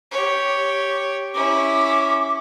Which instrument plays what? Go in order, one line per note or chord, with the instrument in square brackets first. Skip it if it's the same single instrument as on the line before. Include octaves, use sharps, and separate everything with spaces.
[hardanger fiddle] G4 C#5
[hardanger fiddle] C#4 E4 [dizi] D6